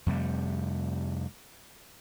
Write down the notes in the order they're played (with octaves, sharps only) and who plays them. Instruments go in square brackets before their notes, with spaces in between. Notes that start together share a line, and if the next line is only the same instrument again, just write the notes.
[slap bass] F2 C3 G3 A3